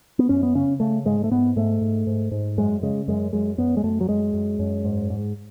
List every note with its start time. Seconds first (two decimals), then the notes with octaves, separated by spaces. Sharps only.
0.19 B3
0.29 F#2 C#4
0.43 B3
0.55 C#3 C#4
0.80 C#3 A3
1.05 G#2 G#3
1.24 A3
1.31 G#2 B3
1.56 G#2 A3
1.81 G#2
2.07 G#2
2.31 G#2
2.58 F#2 G#3
2.83 C#3 G#3
3.08 F#2 G#3
3.33 F#2 G#3
3.58 F#2 B3
3.77 G#3
3.84 F#2 A3
4.01 F#3
4.09 F#2 G#3
4.34 F#2
4.59 F#2
4.85 G#2
5.10 G#2